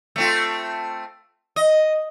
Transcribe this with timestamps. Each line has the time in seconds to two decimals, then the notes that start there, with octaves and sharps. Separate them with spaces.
0.16 A3 C4 F4
1.56 D#5